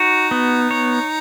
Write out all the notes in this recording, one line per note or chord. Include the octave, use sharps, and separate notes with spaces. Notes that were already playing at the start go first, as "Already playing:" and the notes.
Already playing: D#4 F#4
B3
C#5